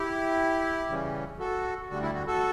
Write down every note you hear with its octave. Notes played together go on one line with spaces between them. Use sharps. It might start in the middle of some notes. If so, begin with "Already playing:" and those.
Already playing: E4 G4
C#3 E3 G3 C#4
F#4 A4
D2 D3 G3 F#4
E4
F#4
F#4 A4